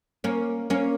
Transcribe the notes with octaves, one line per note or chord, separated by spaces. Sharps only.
A#3 C#4
A#3 C#4